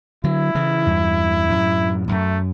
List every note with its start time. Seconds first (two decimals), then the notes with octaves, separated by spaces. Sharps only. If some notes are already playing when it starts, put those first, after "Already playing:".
0.24 D3 F#3 E4
0.55 C#3 E3
0.86 E2 G2
1.49 F#2 A2
2.08 E2
2.12 F#2 A3